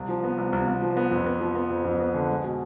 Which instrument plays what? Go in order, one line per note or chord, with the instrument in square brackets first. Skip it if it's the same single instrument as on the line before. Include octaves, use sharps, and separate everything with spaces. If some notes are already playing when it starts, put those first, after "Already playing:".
Already playing: [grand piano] C2
F3
B3
C2
C2
C2
F3
B3
F2
B3
F3
B3
F2
F2
B3
D3
G#3
B2